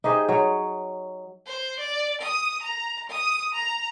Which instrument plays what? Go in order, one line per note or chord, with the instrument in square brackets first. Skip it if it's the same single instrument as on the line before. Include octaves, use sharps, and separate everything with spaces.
[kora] D#4 G4 G#4 C5
F#3 C#5
[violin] C5
D5
D#6
A#5
D#6
A#5